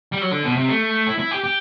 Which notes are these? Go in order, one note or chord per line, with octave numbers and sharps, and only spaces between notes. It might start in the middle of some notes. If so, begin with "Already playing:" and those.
G3
F#3
D3
B2
C3
A3
E4
E4
G4
G4